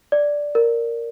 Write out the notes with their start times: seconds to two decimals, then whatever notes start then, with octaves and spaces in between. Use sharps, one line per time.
0.12 D5
0.55 A#4